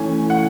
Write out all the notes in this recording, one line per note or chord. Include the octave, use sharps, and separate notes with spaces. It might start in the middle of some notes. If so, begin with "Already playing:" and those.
Already playing: E3 A3 C#4 G#5
F#5